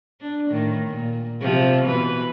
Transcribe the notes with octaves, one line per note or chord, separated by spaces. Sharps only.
D4
A2 D#3
A#2
C3 F3
B2 E3 B4